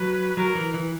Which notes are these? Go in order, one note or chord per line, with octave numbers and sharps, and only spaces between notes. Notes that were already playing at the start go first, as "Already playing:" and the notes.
Already playing: F#3 B4
F#3 A#4
E3
E3